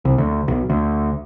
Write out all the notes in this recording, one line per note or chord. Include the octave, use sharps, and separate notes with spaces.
C2
D2
B1
D2